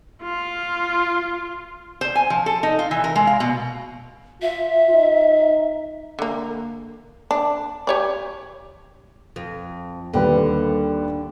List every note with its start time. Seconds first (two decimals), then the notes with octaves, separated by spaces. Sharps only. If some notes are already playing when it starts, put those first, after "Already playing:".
0.23 F4
2.01 C5
2.15 G#5
2.30 F3
2.46 A4
2.63 D#4
2.79 F4
2.91 E3
3.04 A#4
3.16 G#3
3.27 F5
3.40 B2
4.42 F4 E5
4.91 D#4
6.19 D3 A#3
7.31 D4
7.87 G4 C#5 D5
9.36 F2
10.13 D#2 D3 G3 B4